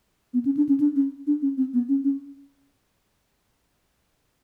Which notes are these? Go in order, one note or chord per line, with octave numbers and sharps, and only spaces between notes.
B3
C#4
D4
C#4
D4
C#4
D4
C#4
C4
B3
C#4
C#4